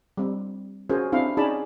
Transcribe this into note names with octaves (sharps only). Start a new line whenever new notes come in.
G3 C4
C#4 F#4 G#4 A#4 C5
C4 D4 E4 F5
C#4 D#4 G#4 D5 A5 B5